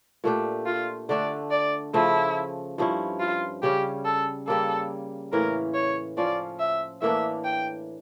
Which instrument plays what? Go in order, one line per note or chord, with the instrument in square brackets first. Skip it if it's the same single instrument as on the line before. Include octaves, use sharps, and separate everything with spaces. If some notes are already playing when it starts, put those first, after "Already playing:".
[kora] A#2 A3 D4 G4
[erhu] F4
[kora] D3 A3 D4 [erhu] D5
[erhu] D5
[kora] C#3 F3 A3 [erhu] E4
[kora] G2 F3 C#4 E4
[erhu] F4
[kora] C#3 G3 C#4 [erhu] G4
[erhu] A4
[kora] C#3 G3 A#3 [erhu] A4
[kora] A2 E3 A#3 C#4 [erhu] A#4
[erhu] C#5
[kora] F3 C#4 F4 [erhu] D5
[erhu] E5
[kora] A2 E3 A#3 D4 [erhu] E5
[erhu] G5